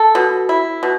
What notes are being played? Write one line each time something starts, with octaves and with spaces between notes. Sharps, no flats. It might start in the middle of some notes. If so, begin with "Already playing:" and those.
Already playing: A4
B2
E4
B2